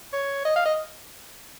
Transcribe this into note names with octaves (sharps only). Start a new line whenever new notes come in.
C#5
D#5
F5
D#5